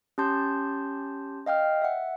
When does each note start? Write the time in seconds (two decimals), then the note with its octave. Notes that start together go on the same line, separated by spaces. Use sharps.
0.18 C#4 G4 A5 C6 G6
1.46 D#5 F5 G5 F6
1.82 E5 F#5